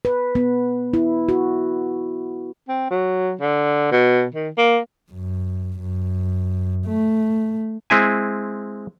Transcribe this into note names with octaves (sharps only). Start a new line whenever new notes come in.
B4
B3
E4
F#4
C4
F#3
D3
B2
D#3
A#3
F#2
F#2
A3
G#3 C4 E4 G#5